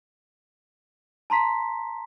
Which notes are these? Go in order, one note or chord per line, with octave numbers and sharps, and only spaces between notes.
A5 A#5 C6 B6